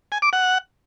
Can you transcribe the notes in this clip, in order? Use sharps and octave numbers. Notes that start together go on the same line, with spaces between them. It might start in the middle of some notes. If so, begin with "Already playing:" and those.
G#5
D6
F#5